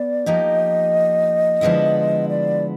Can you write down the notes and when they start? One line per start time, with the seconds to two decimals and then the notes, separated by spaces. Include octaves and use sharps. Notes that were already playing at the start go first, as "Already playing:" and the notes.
Already playing: B3 D5
0.26 F3 A#3 D#4 G4 D#5
1.61 D3 F3 G#3 B3 E4
2.29 D5